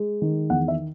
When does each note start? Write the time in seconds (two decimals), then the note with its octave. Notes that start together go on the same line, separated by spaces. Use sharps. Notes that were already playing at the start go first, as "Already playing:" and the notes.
Already playing: G#3
0.22 D#3
0.50 E2 F#5
0.68 E5